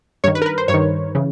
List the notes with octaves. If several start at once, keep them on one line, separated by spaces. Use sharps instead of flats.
G2 D#3 C#5
B4
A#4
B4
C5
G2 C#5
D#3
C#3 E3